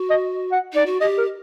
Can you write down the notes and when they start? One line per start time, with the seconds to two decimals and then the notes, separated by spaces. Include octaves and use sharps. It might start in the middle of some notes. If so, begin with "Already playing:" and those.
Already playing: F#4
0.10 D#5
0.52 F#5
0.73 D#4 D5
0.86 F#4
1.01 G4 D#5
1.18 A#4